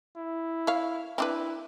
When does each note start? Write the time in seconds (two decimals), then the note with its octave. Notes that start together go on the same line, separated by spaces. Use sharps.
0.17 E4
0.67 C#5 F5
1.18 C4 D4 E4 B4